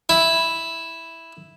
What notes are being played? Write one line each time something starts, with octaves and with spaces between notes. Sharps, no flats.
E4